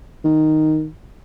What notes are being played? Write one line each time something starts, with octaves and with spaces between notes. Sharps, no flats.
D#3